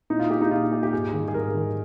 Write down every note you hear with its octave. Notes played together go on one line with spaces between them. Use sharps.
A#2 D#4
F4
G#3 G4
D#4
A#2 F4
G#3 G4
G4
G#2 G#4
D#3 G3
G#4
G#2 A#4
D#3 G3